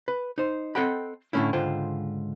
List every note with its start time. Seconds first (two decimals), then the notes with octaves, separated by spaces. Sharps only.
0.08 B4
0.38 D#4 C5
0.75 C4 A4 D#5 F#5 G5 B5
1.33 A2 D3 E3 A3 C#4 E4
1.53 C#2 G#2 D3 F4 C5 G5